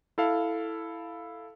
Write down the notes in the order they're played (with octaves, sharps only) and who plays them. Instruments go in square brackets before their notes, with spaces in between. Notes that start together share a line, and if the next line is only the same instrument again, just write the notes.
[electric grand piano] E4 A4 F5